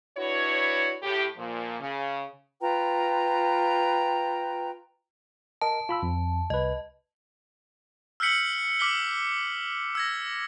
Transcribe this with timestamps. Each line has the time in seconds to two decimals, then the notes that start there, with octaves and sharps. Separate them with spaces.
0.18 D4 E4 F#4 B4 C#5
1.02 A2 G4
1.37 A#2 F3 A#3
1.80 C#3
2.61 F4 B4 G5 A#5
5.61 A#4 D#5 A5
5.89 F4 B5 E6
6.03 F2
6.50 C2 B4 D#5
8.20 E6 F6 G6 B6 C#7 F#7
8.79 D6 F6 B6 F#7 G7
9.95 E6 G#6 A#6